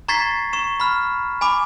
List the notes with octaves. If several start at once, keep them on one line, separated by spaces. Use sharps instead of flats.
A#5 C#6 G#6 A6 B6 C7
C#6 E7
B5 F6
G#5 B5 D6